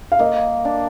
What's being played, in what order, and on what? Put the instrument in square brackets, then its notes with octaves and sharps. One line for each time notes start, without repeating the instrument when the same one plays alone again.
[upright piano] F5
[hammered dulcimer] A#3 [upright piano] D#5
[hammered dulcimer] D4